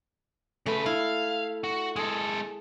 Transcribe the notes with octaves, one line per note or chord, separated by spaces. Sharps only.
C#3 A3 B4
E4 F5
F#4
G#3 G#4 A4